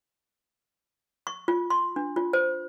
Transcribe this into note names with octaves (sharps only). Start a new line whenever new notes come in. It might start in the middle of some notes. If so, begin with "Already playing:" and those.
C#6
F4
C6
D4
F4
C5